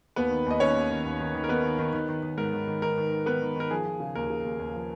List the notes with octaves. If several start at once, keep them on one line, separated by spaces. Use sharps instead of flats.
D#2 B3 B4
D#3
D#2 D#5
D#2 C#4 C#5
D#2
D#3
D#2
D#3
D#3
A#4
D#3 B3 B4
D#3
D#3
D#3
D#3
D#3
G#2 A#4
D#3
D#3
D#3 A#4
D#3
D#3
D#3 B3 B4
D#3
D#3 A#4
F3 G#4
F3
C#3
D#2 A#4
C#3
D#2
D#2
F3